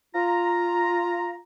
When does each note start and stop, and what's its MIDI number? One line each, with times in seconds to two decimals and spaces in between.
0.16 1.38 65
0.16 1.38 82